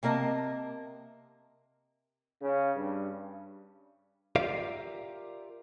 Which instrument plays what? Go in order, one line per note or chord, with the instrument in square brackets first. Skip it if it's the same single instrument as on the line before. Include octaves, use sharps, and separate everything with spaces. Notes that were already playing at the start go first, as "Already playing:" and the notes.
[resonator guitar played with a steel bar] C3 A#3 A#4 D#5 A5
[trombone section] C#3
G2
[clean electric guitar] F4 G4 A#4 D5 E5 F5